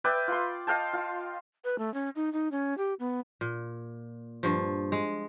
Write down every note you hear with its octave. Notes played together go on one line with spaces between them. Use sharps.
B4 D5 E5 G5
F4 C6
D#5 F5 G5 A5
F4
B4
A3
C#4
D#4
D#4
C#4
G4
B3
A#2
G2 F3
G#3